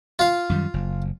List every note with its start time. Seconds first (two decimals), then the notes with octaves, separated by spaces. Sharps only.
0.19 F4 F5
0.50 F#2 D#3 G3
0.74 F#1